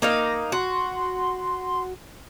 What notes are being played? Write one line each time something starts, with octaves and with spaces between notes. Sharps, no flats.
A#3 D#4 F5 A#6
F#4 C6